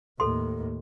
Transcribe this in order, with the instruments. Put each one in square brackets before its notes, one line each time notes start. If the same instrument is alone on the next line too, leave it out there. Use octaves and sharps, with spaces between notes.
[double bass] D#2 A2 [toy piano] A4 C6